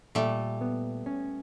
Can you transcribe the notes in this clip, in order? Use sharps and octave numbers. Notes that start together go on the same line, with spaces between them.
A#2 G3 A3
B3
C#4